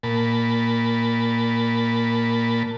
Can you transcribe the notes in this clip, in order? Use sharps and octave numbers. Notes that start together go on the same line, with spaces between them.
A#2 A5 B5